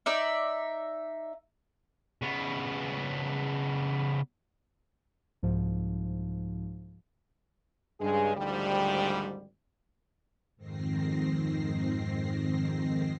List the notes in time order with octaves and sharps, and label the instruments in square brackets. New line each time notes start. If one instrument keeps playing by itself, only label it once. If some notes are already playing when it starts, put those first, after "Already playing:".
[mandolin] D#4 D5 E5
[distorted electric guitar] C#3 B3
[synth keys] C2 G#2 F3
[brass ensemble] G2 C#3 G#3 G#4
G#1 D2 G#2 F3 G3
[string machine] F2 G#2 D#3 C4 A#6 C7